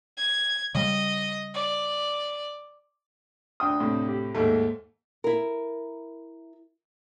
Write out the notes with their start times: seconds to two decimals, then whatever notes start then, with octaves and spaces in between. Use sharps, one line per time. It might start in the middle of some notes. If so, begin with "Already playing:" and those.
0.18 G#6
0.75 C#3 G3 D#5
1.54 D5
3.60 D2 G5 D#6
3.80 A2 C3
4.08 G4
4.35 D#2 G#2 A3
5.24 E4 A#4